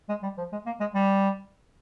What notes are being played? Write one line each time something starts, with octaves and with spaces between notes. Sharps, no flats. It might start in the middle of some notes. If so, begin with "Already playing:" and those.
G#3
G3
F3
G#3
A#3
G#3
G3